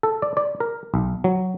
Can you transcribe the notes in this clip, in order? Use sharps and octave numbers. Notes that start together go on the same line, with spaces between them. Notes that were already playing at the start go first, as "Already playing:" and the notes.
A4
D5
D5
A#4
B1
F#3